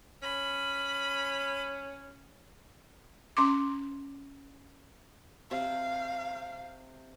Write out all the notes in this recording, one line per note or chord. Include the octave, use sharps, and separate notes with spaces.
C#4 B5
C#4 C6 D6
C3 F5